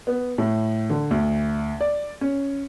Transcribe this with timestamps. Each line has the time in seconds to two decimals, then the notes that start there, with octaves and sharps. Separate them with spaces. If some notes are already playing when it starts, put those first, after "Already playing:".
0.07 B3
0.38 A2
0.90 D3
1.11 D2
1.81 D5
2.21 C#4